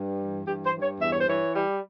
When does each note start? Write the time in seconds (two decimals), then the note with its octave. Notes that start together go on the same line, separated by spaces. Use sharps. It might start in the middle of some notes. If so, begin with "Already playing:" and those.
Already playing: G2
0.19 E3
0.46 G2 G4
0.65 C5
0.73 G2
0.82 C#5
1.00 E2 E5
1.10 C#5
1.20 C5
1.28 E3 C#5
1.55 G3